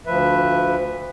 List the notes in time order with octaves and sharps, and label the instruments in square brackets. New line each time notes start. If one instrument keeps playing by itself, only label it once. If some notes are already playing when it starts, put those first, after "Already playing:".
[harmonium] D2 F3 B4 E5